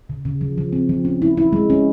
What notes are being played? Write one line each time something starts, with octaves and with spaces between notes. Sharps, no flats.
C#3
C#3
F3
F3
C4
F3
C#4
E4
E4
G#3
C#4